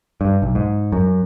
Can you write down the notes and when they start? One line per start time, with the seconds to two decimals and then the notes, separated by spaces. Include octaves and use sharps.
0.21 G2
0.42 B1
0.55 G#2
0.92 F#2